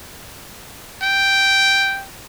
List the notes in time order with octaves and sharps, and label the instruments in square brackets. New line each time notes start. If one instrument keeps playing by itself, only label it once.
[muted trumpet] G5